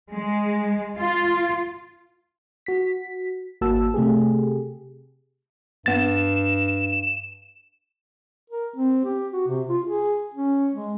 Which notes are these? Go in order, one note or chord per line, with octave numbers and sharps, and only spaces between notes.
G#3
F4
F#4 B6
G#1 A#3 F#4 A5 E6
C3 A3 G4 G#4
G2 B3 A6 E7
A#4
C4
G4
F#4
C3
F4
G#4
C#4
G#3